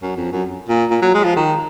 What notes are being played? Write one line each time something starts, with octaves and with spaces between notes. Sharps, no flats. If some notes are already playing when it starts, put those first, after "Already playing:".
F#2
F2
F#2
A#2
A#2
F#3
G#3
F3
D#3